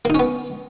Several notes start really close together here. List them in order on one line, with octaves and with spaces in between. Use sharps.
A#3 D#4 C#4 B3